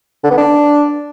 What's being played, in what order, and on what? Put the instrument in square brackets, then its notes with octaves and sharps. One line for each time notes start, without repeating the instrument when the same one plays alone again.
[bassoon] D3
B3
D4